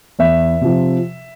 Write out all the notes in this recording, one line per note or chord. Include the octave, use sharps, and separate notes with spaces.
E2 E5
C3 F3